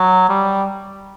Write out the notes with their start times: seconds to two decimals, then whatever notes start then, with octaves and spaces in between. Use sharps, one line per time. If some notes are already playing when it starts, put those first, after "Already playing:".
Already playing: F#3
0.29 G3